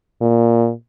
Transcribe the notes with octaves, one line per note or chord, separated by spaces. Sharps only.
A#2